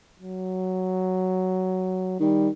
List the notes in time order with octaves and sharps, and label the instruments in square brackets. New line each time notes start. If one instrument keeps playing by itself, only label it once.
[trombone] F#3
[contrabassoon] D#3 [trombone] G3